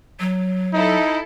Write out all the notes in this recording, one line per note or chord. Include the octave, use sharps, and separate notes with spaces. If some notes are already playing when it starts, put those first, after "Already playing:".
F#3
D#4 E4 A4